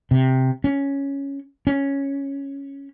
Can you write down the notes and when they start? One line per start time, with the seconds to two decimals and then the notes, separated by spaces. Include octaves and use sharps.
0.11 C3
0.64 C#4
1.67 C#4